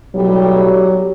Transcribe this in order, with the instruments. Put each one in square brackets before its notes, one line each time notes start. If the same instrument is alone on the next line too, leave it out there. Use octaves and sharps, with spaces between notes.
[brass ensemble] B1 A2 G3 [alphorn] F#3 [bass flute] G4